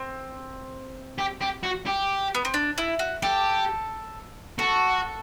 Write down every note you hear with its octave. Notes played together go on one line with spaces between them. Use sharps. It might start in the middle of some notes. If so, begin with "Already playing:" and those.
Already playing: C4
G4
G4
F#4
G4
B3
C4
D4
E4
F#4
G4 A4
F#4 A4